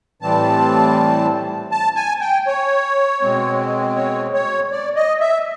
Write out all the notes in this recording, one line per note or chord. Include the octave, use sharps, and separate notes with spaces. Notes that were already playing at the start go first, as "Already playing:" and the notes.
A2 E3 G3 C4 A5
A5
G#5
G5
C#5
B2 G#3 C4
C#5
C#5
D5
D#5
E5